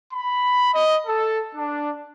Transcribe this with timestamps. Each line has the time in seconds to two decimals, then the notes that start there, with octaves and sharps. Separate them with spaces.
0.13 B5
0.73 D#5
1.07 A4
1.55 D4